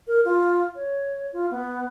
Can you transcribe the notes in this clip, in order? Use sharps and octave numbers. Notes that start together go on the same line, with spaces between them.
A#4
F4
C#5
F4
B3